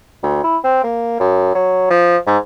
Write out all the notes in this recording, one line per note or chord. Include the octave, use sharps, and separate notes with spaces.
D2
E4
C4
A#3
F#2
F#3
F3
G#2